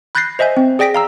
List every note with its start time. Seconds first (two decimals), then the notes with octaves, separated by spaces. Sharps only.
0.15 B5 F#6 G6 A6 A#6 C7
0.39 C5 D#5 E5 G#5 G6
0.57 C4
0.79 G#4 D5 G5 A#6 B6 D7
0.94 F5 A#5 E6